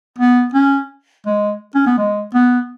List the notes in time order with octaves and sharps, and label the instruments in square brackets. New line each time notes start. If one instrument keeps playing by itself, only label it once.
[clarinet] B3
C#4
G#3
C#4
B3
G#3
B3